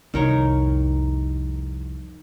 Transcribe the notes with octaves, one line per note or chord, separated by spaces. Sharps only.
C2 F2 D#3 A#4 C#5